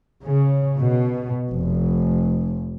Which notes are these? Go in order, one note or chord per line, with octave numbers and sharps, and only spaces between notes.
C#3
B2
F1